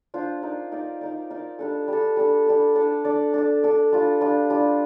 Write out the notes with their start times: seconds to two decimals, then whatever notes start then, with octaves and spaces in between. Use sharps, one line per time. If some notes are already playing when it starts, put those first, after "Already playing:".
0.14 D4 F4 C5
0.42 D#4 A#4 D5
0.72 D#4 A#4 D5
1.01 D#4 A#4 D5
1.30 D#4 A#4 D5
1.59 G3 D4 A4
1.88 G3 D4 A4
2.17 G3 D4 A4
2.46 G3 D4 A4
2.75 D4 A4 D5
3.04 D4 A4 D5
3.34 D4 A4 D5
3.64 D4 A4 D5
3.92 G3 D4 F4
4.21 G3 D4 F4
4.50 G3 D4 F4